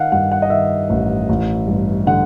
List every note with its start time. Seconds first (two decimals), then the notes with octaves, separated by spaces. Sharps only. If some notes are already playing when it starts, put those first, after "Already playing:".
Already playing: D#3 F5 F#5
0.12 G2 F#5
0.32 F#5
0.42 D#5
0.50 D#3 E5
0.89 A1
1.29 A1
1.68 G2
2.07 D3 F#5